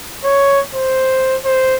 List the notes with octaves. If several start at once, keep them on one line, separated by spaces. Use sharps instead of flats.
C#5
C5
C5